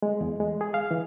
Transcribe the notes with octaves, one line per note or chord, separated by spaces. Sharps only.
G#3
E2
G#3
G#4
F5
E3